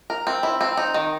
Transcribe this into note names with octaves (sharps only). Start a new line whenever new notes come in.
A#4
C4
E4
C4
D#4
D#3